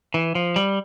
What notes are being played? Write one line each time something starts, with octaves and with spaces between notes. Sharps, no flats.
E3
F3
G3